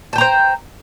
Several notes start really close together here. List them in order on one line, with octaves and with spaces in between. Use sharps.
A5 G5 A#5 C5